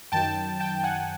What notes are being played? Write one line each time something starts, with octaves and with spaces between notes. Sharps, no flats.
F#2 D#3 F#3 G5 A5
G5 A5
F#5 G#5